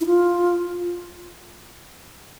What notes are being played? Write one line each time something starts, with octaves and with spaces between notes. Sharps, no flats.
E4
F4